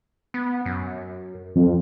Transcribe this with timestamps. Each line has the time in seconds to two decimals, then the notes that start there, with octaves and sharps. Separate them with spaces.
0.34 B3
0.65 F#2
1.55 F2